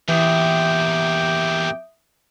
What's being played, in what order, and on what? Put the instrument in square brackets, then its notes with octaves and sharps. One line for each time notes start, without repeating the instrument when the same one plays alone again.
[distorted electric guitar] E2 A#2 [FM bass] E3 [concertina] G4 G5 [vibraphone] E5 D#6